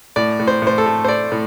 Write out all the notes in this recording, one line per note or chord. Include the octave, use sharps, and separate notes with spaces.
A2 D5
A2
C5
A2 C5
A4
A3
C5
A3 D5
A2